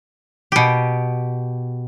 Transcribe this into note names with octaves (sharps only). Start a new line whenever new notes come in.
B2 G4